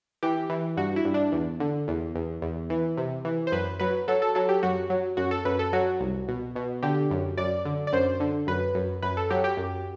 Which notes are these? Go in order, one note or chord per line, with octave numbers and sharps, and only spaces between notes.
E3 G4
E3
G2 F#4
E4
G2
D4
E2
D3
E2
E2
E2
E3
C3
E3
C5
F#2 B4
F#3 B4
F#3 A4
A4
F#3 A4
G4
F#2 F#4
F#3
F#2 F#4
A4
F#2 B4
A4
F#3 F#4
C2
B2
B2
D3 G4
F#2
F#2 D5
D3
D5
F#2 C5
D3
F#2 B4
F#2
F#2 B4
A4
F#3 G4
G4
F#2